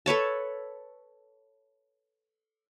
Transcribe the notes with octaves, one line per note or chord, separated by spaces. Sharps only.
A4 B4 C#5 A5